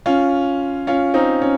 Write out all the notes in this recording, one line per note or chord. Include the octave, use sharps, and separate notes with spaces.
C#4 F4
C#4 F4
C4 D#4
C#4